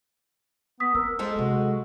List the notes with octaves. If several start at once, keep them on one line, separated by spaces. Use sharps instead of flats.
B3 D#6 B6
C4 A#4 E6
G#3 F4 A4 C5
C3 F#3 F#4